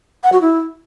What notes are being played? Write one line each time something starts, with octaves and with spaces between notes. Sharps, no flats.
F#5
F#4
E4